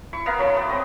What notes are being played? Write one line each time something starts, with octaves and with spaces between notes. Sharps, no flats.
E4 C#6
B3 E4 A#4 F5
F#3 C#4 A4
A3 B3 D5
C4 D#5